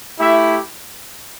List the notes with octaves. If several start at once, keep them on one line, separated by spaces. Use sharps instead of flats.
A3 E4 G4 E5